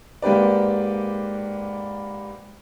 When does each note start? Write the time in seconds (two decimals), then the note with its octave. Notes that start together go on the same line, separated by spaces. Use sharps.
0.22 G#2 A#3 G4 B4 D5